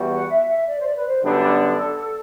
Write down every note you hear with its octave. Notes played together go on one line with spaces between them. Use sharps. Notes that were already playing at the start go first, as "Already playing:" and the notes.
Already playing: E2 G3 B3 F#4
F#5
E5
E5
D5
C5
D5
B4
C5
F#2 D3 G3 B3 D4 A4